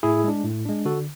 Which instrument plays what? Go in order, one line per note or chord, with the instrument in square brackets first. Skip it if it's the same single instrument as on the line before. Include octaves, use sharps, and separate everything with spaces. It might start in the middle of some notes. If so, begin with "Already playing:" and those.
[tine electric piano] A2 E4 G#4
G#3 D4
A2
G#3 D4
D3 F#4 A4